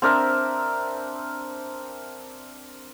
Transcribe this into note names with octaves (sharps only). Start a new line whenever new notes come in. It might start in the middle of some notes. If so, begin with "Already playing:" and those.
C4 D4 A#4 E5